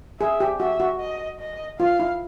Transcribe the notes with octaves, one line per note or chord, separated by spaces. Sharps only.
G#4 E5
G4
F#4 E5
F#4
D#5
D#5
F4 F5
E4